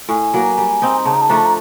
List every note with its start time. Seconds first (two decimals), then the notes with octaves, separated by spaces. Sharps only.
0.09 A2 G#5
0.34 F#3 A#3
0.58 G3
0.82 C4 D#4
1.06 C#3 A5
1.14 A#5
1.21 A5
1.29 F3 A3 D4 A#5
1.37 A5
1.45 A#5